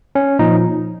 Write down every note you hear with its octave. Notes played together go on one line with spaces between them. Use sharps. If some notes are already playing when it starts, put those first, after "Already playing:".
C#4
A#2 F3 D#4